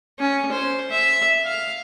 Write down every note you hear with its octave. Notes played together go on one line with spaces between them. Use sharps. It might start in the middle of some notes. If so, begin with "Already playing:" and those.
C#4
C5
E5
F5